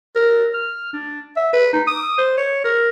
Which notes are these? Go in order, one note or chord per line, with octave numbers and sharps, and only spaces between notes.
A#4
F6
D4
E5
B4
D#4
D#6
C5
C#5
A#4